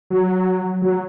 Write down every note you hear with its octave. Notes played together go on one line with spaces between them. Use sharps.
F#3
F#3